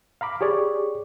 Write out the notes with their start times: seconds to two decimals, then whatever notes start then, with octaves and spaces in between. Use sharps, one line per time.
0.21 F5 A#5 B5 D6
0.41 G4 G#4 C#5 D5